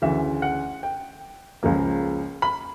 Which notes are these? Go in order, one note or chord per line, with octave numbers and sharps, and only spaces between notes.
D2 C#3 E3 E5
F#5
G5
C#2 C#3 F3 A#3
B5